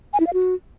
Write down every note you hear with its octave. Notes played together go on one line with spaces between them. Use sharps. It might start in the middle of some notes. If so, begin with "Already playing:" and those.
G#5
E4
F5
F#4